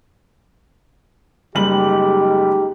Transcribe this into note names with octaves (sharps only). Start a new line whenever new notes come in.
F#1 G3 G#3 D#4 G4 F#7